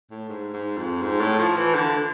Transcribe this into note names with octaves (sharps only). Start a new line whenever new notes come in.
A2
G#2
G#2
F2
G#2
A2
F3
E3
D3